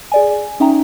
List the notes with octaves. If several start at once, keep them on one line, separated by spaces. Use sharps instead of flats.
G#4 D5 G#5
C#4 D#4 E5 G5 A#5